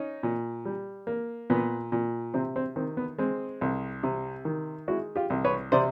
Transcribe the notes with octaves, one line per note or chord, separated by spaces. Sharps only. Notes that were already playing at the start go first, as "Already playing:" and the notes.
Already playing: C#4 D#4
A#2
G3
A#3
A#2 B3
A#2
C3 C4
C4
D#3 C4
B3
G#3 C4
C2
C3
D#3
G#3 E4 F#4
F4 G4
C2
B4 C#5
C3 C5 D5